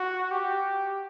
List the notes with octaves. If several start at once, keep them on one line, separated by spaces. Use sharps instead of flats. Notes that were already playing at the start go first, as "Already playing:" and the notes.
Already playing: F#4
G4